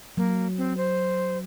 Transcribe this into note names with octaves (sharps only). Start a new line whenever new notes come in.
F#3 A#3
C4
C5